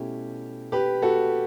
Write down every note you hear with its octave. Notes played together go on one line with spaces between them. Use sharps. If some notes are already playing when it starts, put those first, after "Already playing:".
Already playing: B2 A3 C#4 E4 G4
G4 B4
F#4 A4